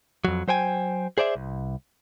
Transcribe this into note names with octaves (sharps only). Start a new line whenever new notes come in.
F2 F#3
F#3 C5 G5 G#5
G#4 C5 D5 E5
C2